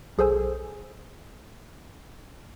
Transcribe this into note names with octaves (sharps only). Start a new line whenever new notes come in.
B1 G#4 A4 C5 G#5 E6